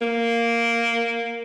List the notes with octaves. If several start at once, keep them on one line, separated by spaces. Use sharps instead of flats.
A#3